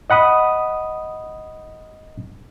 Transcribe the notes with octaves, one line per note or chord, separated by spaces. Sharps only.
D#5 F#5 B5 D#6